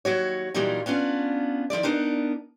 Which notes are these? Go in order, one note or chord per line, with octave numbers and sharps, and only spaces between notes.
D#2 F#3 F#4 C#5
A#2 E3 F#3 G3 D#4 F4
B3 C#4 D4 F4
D#3 F3 E4 D5
B3 D4 D#4 A#4